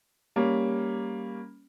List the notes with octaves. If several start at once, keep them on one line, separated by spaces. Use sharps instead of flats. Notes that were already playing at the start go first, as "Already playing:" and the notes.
G3 A#3 C#4